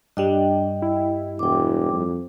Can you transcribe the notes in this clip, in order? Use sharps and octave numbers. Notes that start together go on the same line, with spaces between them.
G2 G3 D4 D#5 G5
E4
E1 G5 D6
F2